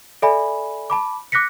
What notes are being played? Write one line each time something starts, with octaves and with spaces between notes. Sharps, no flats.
A4 D5 E5 G#5 B5
A5 B5 D6
D6 F#6 A#6 B6 C#7